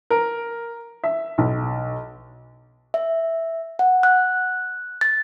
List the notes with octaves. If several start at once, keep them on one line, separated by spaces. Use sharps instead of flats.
A#4
E5
B1
E5
F#5
F#6
A6